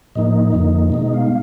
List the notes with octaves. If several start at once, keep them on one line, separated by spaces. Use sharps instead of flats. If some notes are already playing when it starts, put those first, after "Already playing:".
A2 F3 A#3 D#4 D#5
F2 D3 F3 A#3 D#4
B2 G#3 B3 D#4 D#5
D#5
F5
G3